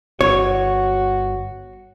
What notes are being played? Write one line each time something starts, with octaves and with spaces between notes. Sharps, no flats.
G1 F#4 C#5